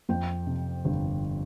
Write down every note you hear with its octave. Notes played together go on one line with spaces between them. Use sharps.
F2 G5
C3
G1